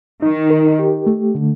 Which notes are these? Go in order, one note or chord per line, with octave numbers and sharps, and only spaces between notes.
D#3 D#4
A#4
G4
A3
D3